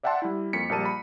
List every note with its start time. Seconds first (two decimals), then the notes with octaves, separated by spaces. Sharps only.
0.03 D5 E5 F#5 G5 A5 C6
0.22 G3 E4
0.53 F2 A#3 B6 C#7
0.69 A#1 G3 A#4 A5 D#7
0.85 B5